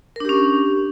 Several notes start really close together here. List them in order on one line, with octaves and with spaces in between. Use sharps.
A#4 D4 G4 C#4